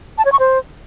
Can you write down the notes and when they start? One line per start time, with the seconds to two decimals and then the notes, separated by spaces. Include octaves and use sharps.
0.18 A5
0.25 C#5
0.32 C#6
0.39 C5